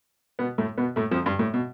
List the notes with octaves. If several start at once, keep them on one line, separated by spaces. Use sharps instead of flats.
B2 B3
A2 A3
B2 B3
A2 A3
F2 F3
G2
A2
B2